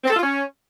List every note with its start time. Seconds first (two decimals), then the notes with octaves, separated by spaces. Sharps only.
0.04 C4
0.10 A4
0.16 F4
0.23 C#4